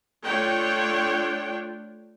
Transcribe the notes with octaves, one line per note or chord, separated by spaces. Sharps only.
A3 D4 F4 C#5 G5